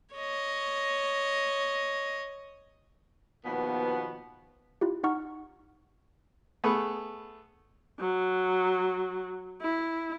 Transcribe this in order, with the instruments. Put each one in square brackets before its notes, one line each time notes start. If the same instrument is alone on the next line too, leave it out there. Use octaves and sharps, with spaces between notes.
[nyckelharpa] C#5 D#5
[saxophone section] D#2 B2 F3 B3
[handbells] E4 F4 G4
D#4 F#5 C#6 F6
[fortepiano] A3 B3 G#4 B4
[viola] F#3
E4